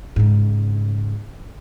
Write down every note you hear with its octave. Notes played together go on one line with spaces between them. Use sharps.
G#2 C#3